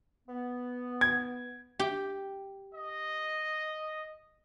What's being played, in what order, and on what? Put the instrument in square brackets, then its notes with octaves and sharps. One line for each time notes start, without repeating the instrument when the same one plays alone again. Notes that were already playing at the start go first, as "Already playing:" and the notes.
[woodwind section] B3
[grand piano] G#6
[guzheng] G4
[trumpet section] D#5